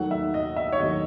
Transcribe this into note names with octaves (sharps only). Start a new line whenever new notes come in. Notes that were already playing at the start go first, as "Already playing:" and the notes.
Already playing: D#2 D#3 F#3 A3 F#5
E5
D#5
E5
C#5
D#2 D#3 F#3 A3 D#5